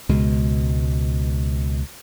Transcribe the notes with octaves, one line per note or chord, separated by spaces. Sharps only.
C#2 B2 G#3